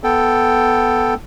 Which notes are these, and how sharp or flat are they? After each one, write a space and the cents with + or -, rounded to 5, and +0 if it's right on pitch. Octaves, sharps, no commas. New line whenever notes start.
B3 +0 A4 +0 G5 +0